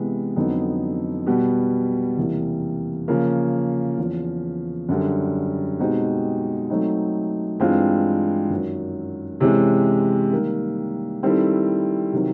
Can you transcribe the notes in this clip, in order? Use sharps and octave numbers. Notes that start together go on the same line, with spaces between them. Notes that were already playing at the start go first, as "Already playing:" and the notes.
Already playing: C3 E3 G#3 B3
F2 D3 F#3 B3 D#4
B2 G3 B3
E2 C3 E3 G3 A#3
C#3 F3 A#3
E2 C#3 F3
F#2 D3 G3
B2 G#3 C4 D#4 G4
F#3 A3 C4 D#4
G2 E3 G#3 C4 F4
F#2 D#3 F#3
C3 E3 G#3 C#4
D#3 G3 A#3
D#3 G3 C4 E4 A4
C3 D#3 F#3